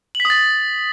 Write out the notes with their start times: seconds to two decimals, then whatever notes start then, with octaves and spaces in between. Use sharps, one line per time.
0.15 F#7
0.20 B6
0.25 D#6
0.30 A6